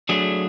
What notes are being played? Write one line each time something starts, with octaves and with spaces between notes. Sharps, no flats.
F#3 A3 D4 G#4